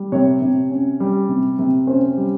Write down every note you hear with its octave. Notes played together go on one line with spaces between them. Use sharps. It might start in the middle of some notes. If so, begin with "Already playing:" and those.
Already playing: G3
C3 C#5
C3
C#4
G3
C3
C3
C#4 C5
G3